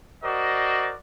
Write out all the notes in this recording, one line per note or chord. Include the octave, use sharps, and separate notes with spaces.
F#4 A#4 C5 D5 D#5